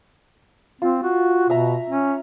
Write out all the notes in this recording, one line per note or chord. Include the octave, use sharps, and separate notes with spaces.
C4 F4
F#4
B2 E5 A#5
C#4